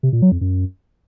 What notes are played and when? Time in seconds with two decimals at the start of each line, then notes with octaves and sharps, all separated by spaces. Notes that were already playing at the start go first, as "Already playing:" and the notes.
0.03 C3
0.13 A#2
0.22 F#3
0.32 F2
0.41 F#2